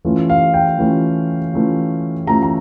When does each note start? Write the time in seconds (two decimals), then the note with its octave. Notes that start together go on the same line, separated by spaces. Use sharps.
0.05 E3 A3 C#4 F4
0.30 F5
0.54 G5
0.78 E3 A3 C#4 F4
1.53 E3 A3 C#4 F4
2.27 E3 A3 C#4 F4 A#5
2.43 A#5